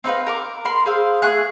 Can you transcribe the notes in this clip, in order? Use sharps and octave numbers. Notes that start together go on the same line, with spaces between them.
C4 D#4 B4 F5
A#4 A#5 D6
A#4 B5 C6
G#4 C5 F5 E6
A3 G#4 F#6